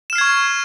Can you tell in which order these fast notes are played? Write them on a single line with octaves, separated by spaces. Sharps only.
E7 F6 C7 G#6 C#6